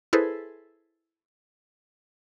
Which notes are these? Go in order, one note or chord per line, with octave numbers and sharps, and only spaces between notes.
E4 G#4 A4 B4 C5